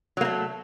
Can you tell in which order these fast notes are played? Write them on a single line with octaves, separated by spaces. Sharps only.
F#3 A#3 A3